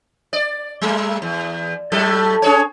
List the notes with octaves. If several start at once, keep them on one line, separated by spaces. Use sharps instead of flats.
D5
G3 A3
E2
A2 F#3 A4
C#4 G#4 C#5